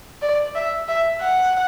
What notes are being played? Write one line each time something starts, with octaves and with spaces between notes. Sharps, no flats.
D5
E5
E5
F#5